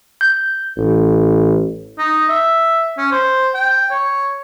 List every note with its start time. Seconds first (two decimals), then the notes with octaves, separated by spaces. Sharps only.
0.21 G6
0.77 A1
1.98 D#4
2.29 E5
2.98 C#4
3.11 C5
3.54 G5
3.91 C#5